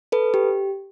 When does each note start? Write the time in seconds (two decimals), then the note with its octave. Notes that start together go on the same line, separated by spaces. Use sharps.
0.12 A4 B4
0.34 G4